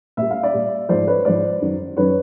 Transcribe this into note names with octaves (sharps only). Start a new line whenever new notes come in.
A#2 G3 E5
F5
D5 E5
A#2 G3
G#2 F3 C5 D5
B4 C#5
G#2 F3 C5 D5
F#2 D#3 F#3
F#2 D#3 F#3 B4 C#5